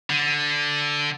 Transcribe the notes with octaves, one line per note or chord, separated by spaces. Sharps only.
D3